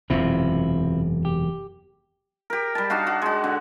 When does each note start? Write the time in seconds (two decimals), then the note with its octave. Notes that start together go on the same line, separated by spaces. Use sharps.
0.10 E1 F#2 C3 C4 E4 F4
1.25 G4
2.50 G4 A#4
2.75 G3 A5
2.90 D4 D#4 F#4 F5
3.07 F#4
3.22 G#3 F#4
3.44 D3